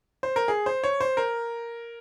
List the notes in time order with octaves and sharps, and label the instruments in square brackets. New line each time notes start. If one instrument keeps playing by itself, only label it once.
[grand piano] C5
A#4
G#4
C5
C#5
C5
A#4